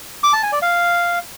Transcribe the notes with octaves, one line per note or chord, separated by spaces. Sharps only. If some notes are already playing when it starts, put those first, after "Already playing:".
D6
A5
G#5
D5
F5